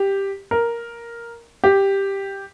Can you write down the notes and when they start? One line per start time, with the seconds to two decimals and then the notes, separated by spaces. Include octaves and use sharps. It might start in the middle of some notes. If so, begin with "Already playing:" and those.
Already playing: G4
0.51 A#4
1.64 G4